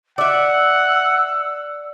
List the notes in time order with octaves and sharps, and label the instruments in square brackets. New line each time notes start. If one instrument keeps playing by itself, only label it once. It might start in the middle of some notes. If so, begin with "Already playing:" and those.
[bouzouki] D5 E5 [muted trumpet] F#5 [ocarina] E6